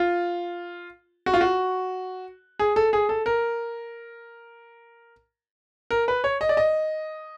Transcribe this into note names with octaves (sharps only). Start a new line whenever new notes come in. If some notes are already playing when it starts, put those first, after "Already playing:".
Already playing: F4
F#4
F4
F#4
G#4
A4
G#4
A4
A#4
A#4
B4
C#5
D#5
D5
D#5